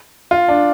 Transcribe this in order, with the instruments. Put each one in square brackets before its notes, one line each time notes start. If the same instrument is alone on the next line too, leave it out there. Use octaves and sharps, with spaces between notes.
[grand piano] F4
D4